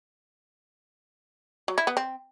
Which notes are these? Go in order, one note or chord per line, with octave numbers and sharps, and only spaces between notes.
F#3
E4
B3
C4